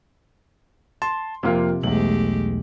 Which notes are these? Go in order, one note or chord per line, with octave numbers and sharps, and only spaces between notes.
A5 C6
F2 C3 A#3 F4
B1 E2 G#3 A3 G4 F#7